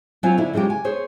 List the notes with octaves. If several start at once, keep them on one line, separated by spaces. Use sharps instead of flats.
F#3 C4 F4 G#5
D3 E4
C#3 F#3 G#3 F4 G4
G#5
G#4 C5 C#5